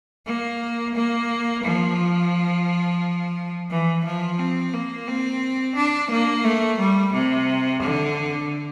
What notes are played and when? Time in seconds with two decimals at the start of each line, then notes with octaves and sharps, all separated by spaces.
0.26 A#3
0.95 A#3
1.64 F3
3.70 E3
4.05 F3
4.39 C4
4.74 A#3
5.08 C4
5.76 D4
6.11 A#3
6.45 A3
6.79 G3
7.14 C3
7.82 D3